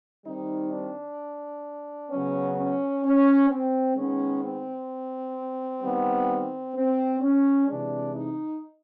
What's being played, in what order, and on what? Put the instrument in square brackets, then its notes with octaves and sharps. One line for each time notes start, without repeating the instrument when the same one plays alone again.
[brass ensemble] D#3 G3 C4 D#4
D4
C#3 F#3 B3 C#4
C#4
C#4
C4
D#3 G#3 B3 C#4
C4
D#3 G3 B3
C4
C#4
C3 E3 G#3 D4
D#4